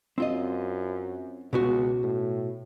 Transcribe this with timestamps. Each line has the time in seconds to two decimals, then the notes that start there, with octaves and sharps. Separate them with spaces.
0.18 F#2 C4 F4 D#5
1.53 C#2 B2 B3 F#4
2.03 A2